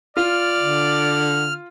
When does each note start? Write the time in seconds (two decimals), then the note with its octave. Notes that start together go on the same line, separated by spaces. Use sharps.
0.17 F4 D5 F6
0.59 D3